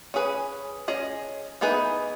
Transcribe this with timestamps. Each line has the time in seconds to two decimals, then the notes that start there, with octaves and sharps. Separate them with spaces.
0.14 C#4 G#4 B4
0.88 C#4 G#4 D#5
1.61 E3 B3 D#4 G#4 B4